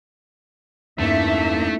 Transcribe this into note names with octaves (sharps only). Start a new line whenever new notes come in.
E2 G2 A3 A#3 C#4 D#4 E4 E5